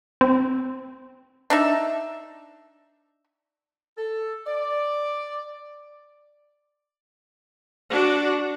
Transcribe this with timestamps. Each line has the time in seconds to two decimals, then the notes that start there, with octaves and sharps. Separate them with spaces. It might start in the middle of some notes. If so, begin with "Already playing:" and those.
0.21 C4
1.50 D4 D#4 E5
3.98 A4
4.47 D5
7.90 D4 F#4